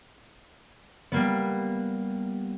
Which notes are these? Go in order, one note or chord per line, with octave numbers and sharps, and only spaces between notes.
G3 A#3 B3